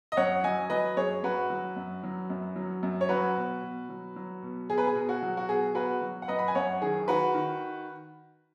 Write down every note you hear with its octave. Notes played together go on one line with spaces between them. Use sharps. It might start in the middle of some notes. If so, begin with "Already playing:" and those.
D#5
F#2 C#5 F#5
F#3 D#5 G#5
F#3 B4 D#5
F#2 G#4 C#5
F#2 F#4 B4
F#3
F#2
F#3
F#2
F#3
F#2
C#5
F#3 F#4 B4
B2
B2
F#3
F#3
B2
B2 G#4
B4
G#4
B2
F#4
F#3
F#4
B2 G#4
B2 F#4 B4
F#3
F#5
F#2 B4 D#5
B5
G#5
F#2 C#5 F#5
D#3 G#4
D#3 F#4 B4
D#3